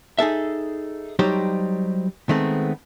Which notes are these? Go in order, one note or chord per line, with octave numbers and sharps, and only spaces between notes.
D#4 G#4 A4 E5
F#3 G3 D#4 G4 C5
D#3 G#3 A3 B3 C4